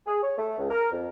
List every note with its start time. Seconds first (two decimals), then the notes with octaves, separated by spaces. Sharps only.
0.07 G#4
0.23 C#5
0.38 A3
0.58 C#2
0.70 A#4
0.91 F2